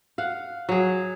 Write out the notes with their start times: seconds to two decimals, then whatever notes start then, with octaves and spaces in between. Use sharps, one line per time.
0.18 F5 F#5
0.69 F#3 G#4